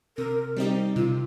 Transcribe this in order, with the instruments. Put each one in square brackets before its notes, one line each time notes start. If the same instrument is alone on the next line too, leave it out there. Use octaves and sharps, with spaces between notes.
[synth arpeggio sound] C3 [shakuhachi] A#4
[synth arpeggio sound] G3 C4 D#4 G4
[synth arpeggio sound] C3 [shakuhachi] F4